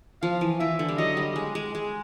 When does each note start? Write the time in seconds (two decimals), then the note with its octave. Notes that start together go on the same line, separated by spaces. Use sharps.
0.22 F3 F5
0.41 E3
0.60 E3 E5
0.79 D3
0.89 G3
0.98 F#3 D#5
1.17 G3
1.36 G#3
1.55 G#3
1.75 G#3